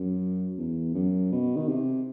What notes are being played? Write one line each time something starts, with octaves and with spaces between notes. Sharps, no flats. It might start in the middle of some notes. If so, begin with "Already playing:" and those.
Already playing: F#2
E2
F#2
B2
D#3
C3